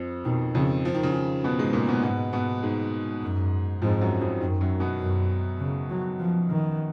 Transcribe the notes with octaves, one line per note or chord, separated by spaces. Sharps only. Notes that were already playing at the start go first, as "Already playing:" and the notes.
Already playing: F2 F3
B2 D#3
F2 C#3 F3
F3
D#3
C#3
D#3
B2 B3
G#2 G#3
A#2 A#3
B2 B3
G#2 B2 B3
B2 B3
G#2 G#3
F#2
F2 G#2 F3
F#2 F#3
F2 F3
F#2 D#3
F#2 F#3
B2 B3
F#2
C#3
F#3
F3
D#3